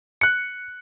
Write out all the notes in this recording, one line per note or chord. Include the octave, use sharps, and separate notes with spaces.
F#6 C#7